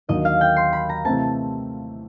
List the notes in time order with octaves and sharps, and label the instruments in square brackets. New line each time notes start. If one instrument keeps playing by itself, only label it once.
[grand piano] D#2 D3 F#3 A#3 D#4 [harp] D#5
[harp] F5
G5
C6
B5
A#5
[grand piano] C3 E3 A3 C4 [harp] A5